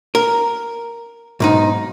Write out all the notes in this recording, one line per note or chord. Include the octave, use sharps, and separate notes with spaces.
A#4
B1 G#2 D#4